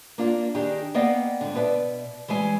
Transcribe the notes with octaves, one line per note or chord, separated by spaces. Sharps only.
A#3 D4 F4
D#3 D4 D#4 G4 G#4
A#3 B3 D5 D#5 F5 G5
G#2 D3
B2 B4 D5 E5
E3 G3 G#3 G#5